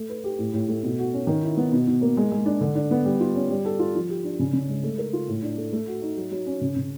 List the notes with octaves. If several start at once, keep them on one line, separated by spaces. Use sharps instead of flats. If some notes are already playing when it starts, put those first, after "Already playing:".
Already playing: A3
B4
G4
A2
A2
A3
B2
F#4
C#4
D#3
E4
B3
B2
B2
A#3
G#3
G#3
D4
D3
D4
B3
G3
F4
C#4
G3
A4
F4
F3
G4
D4
C#3
C#3
G#3
A3
A#4
F4
A2
D4
A3
A3
F#4
D#4
F#3
F#3
C#4
C#3
C#3